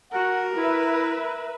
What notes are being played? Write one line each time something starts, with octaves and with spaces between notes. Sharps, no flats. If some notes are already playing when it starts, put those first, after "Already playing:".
F#4 A#4 F#5
E4 B4 E5